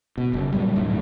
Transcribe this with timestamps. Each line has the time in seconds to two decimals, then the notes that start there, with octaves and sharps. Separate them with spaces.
0.18 B2
0.33 F#1
0.52 A#2 F#3 G3
0.76 G1 D2 A2 A3